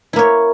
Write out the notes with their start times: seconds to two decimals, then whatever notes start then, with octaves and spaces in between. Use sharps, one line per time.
0.13 E4
0.16 A#3
0.19 C#5